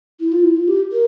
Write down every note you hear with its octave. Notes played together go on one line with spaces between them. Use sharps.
E4
F4
E4
F4
G4
A#4